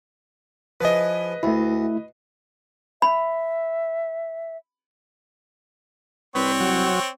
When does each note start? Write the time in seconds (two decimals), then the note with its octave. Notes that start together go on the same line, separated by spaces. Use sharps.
0.81 F3 E4 G#4 B4 D#5
1.43 D2 A3 E4
3.02 E5 B5
6.35 C2 C4 B4 C#5
6.60 F#3